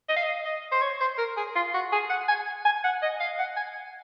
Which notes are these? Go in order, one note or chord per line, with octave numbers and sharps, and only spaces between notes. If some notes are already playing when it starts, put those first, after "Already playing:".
D#5
F5
D#5
D#5
C5
C#5
C5
A#4
G#4
F4
F#4
G#4
F#5
G#5
G#5
F#5
D#5
F5
F#5
G#5